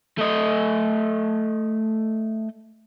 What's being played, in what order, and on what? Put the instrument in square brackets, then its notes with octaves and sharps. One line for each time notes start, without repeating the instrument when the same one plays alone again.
[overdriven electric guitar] A3 D#5